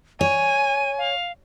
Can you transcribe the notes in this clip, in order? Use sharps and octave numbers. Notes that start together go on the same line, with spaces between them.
C#5 G#5 D#7
F5